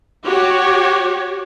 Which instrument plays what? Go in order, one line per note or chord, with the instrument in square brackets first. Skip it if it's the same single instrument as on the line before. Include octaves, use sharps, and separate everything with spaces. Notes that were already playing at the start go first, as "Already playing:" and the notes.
[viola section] F#4 G4 C#5